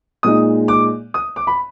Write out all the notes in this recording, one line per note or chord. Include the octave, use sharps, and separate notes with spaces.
A#2 G#3 D#4 D#6
D6
D#6
D6
B5